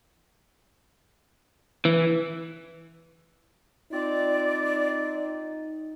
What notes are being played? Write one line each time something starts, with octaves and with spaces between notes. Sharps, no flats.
E3
C4 D#4 F4 D5